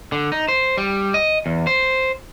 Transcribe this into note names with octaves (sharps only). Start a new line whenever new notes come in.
D3
D#4
C5
G3
D#5
E2
C5